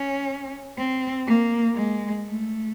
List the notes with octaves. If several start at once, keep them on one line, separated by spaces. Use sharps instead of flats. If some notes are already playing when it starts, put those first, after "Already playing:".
Already playing: C#4
C4
A#3
G#3
A3